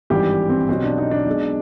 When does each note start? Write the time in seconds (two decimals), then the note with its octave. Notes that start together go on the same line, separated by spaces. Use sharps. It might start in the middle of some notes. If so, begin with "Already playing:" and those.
0.10 G#1 G2 E3 G3 G4
0.49 C4
0.68 B1 B2 F#3 C4
0.84 D4
0.98 D#4
1.11 D4
1.26 B1 B2 G#3